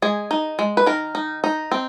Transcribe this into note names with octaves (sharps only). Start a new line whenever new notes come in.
G#3 G#4
D#4
G#3
B4
D#3 A#4
D#4
D#4
C4